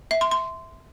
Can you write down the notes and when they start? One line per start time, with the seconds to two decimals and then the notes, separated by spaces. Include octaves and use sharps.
0.11 E5
0.21 C6
0.31 C6